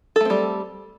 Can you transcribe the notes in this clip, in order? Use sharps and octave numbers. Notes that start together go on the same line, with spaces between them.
G3 A3 C4 A4